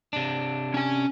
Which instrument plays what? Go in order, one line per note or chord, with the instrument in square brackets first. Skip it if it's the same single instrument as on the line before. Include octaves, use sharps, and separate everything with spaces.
[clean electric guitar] C3 D4
[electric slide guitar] C#4 G#5